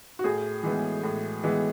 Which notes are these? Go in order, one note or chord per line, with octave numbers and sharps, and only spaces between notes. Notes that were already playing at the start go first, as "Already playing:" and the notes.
F#4
A2 G#4
E3 G#3 B3
A2
E3 G#3 B3